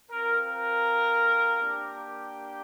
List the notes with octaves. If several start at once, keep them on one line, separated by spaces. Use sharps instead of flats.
C4 F4 A#4
A#4
A#3 D4 G4